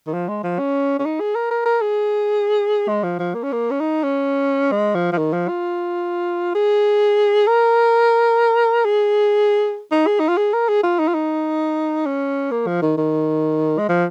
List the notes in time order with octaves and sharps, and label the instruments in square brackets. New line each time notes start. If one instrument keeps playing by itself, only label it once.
[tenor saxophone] D#3
F3
G#3
F3
C#4
C#4
D#4
G#4
A#4
A#4
A#4
G#4
G#3
F3
F3
A#3
C#4
A#3
C#4
D#4
C#4
G#3
F3
F3
D#3
F3
F4
G#4
A#4
G#4
D#4
G#4
D#4
F4
G#4
A#4
G#4
F4
D#4
F4
D#4
C#4
A#3
F3
D#3
D#3
G#3
F3